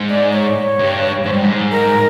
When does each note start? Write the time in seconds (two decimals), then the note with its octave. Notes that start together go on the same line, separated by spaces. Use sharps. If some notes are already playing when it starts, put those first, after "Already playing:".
Already playing: G#2
0.09 D5
0.33 C#5
0.79 G2
1.24 G#2 C5
1.32 G2
1.42 G#2
1.72 A#4